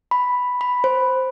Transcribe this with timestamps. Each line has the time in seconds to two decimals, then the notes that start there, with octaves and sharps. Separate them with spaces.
0.11 B5
0.61 B5
0.84 C5